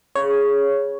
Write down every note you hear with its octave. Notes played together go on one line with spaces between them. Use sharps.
C#3 C#5